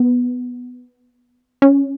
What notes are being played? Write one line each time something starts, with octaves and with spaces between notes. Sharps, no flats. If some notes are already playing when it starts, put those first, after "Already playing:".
Already playing: B3
C#4